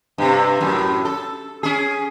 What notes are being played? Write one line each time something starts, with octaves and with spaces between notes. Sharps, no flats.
G2 C3
F#2 A2
A4
C#4 G#4